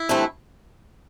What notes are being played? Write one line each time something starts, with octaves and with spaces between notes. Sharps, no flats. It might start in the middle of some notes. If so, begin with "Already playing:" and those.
Already playing: E4
G2 E3 A3 C4